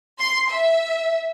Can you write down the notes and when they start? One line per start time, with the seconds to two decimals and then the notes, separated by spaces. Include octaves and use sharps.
0.18 C6
0.49 E5